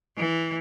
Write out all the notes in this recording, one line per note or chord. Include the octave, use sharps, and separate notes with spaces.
E3